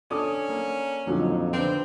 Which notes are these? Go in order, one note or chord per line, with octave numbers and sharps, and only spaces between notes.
C#4 D4 A4 D5 D6 D#6
A#3
F2 A#2 D3 F#3 D#4
D3 C4 D4 B4